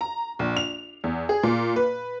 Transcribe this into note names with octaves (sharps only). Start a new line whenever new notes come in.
A#5
A#1
F7
E2
G#4
A#2
B4